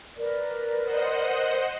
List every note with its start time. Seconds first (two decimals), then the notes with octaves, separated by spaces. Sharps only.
0.17 A#4 B4 D5
0.82 C5 D#5 F#5